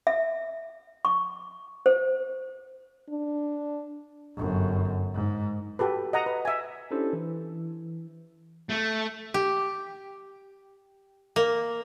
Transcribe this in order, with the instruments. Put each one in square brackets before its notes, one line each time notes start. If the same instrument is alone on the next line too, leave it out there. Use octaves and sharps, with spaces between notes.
[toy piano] E5
C#6
C5
[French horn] D4
[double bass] G1 F#2
G#2
[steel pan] F#4 G4 A4 B4
D#5 F#5 A#5 D#6
B4
E5 G#5
[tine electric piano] C#4 D4 E4 G4 A4 C5
E3
[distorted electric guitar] A3
[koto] G4
A#3